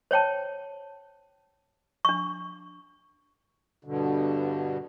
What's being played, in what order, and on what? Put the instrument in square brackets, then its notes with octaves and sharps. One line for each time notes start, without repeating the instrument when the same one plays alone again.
[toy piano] C5 C#5 G5 A5
D4 C#6
[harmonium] G2 B2 D3